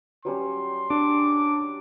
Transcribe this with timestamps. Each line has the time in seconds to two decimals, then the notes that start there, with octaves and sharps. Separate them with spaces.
0.25 F#3 G3 C#4 C6
0.90 D4 D6 D#6